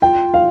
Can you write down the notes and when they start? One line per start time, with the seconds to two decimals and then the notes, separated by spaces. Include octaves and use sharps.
0.02 F4 G5
0.34 F5